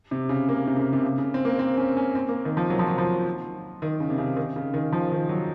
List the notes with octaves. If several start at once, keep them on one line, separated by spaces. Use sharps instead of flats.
C3
C#3
A#3
C3
C#3
C3
C#3
C#3
C4
A#3
C4
C#4
C#4
C4
A#3
D#3
F3
F#3
F3
F#3
F3
D#3
C#3
C3
C#3
D#3
C#3
D#3
F3
D#3
F#3